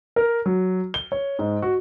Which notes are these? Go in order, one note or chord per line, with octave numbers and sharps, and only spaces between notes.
A#4
F#3
G7
C#5
G#2
F#4